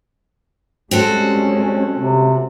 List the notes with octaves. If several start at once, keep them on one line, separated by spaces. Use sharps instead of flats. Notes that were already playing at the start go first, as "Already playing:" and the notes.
G3 G#3 C4 C#4 F#4 A4
C3